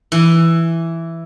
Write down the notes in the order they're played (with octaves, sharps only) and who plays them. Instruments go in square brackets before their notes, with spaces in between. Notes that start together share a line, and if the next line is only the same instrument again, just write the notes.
[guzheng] E3